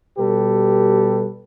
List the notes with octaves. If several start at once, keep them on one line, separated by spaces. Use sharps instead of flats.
B2 G3 G4 A4 B4